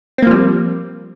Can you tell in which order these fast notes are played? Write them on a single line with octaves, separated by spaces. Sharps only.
C4 A#3 F3 G3